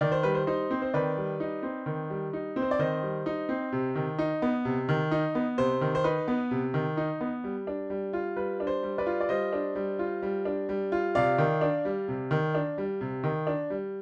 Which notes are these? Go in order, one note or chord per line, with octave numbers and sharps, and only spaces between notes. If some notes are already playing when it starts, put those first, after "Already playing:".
D#3 D5
C5
G3 B4
C5
D#4 C5
C4
C5
D#3 B4 D5
G3
D#4
C4
D#3
G3
D#4
C4
C5
D5
D#3 C5 D#5
G3
D#4
C4
C3
D#3
D#4
B3
C3
D#3
D#4
B3
C3 C5
D#3
C5
D#4 B4
B3
C3
D#3
D#4
B3
G3
D4
G3
F4
G3 B4
D4
C5
G3
B4 D5
F4
D5
G3 C5 D#5
D4
G3
F4
G3
D4
G3
F4
C3 D5 F5
D#3
D4
G3
C3
D#3
D4
G3
C3
D#3
D4
G3